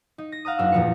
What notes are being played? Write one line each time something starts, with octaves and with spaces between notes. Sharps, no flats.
D#4
A#6
F5 F#5 A#5 D#6
F#1 D4 E6
E2 A#2 F3 B4 C#7